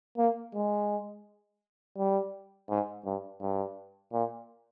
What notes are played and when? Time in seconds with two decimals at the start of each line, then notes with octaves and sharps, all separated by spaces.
0.18 A#3
0.55 G#3
1.97 G3
2.70 G#2
3.05 G2
3.41 G2
4.13 A#2